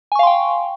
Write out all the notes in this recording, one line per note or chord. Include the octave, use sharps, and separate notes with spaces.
F5 G5 G#5 C6 C#6